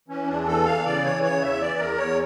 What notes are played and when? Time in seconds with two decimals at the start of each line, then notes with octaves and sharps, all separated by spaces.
0.08 E3 C#4
0.28 E2 D4
0.47 E3 A4
0.65 E3 F5
0.85 C#3 D5
1.04 E3 C#5
1.23 C#3 C#5
1.42 E2 E5
1.61 E3 D5
1.79 E2 A#4
1.98 E2 C#5